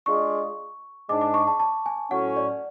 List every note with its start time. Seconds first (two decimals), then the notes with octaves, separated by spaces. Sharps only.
0.06 G#3 D4 F4 G#4 C#6
1.09 G#2 G#3 D4 D6
1.21 D6
1.34 C#6
1.47 A5
1.60 A5
1.86 G#5
2.11 A2 F#3 C#4 F#5
2.36 D5